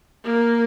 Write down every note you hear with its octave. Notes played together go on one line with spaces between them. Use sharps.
A#3